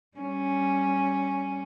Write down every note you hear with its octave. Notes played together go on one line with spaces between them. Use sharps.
G3 C#4